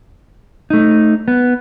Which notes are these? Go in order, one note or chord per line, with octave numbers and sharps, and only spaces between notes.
A3 D#4
B3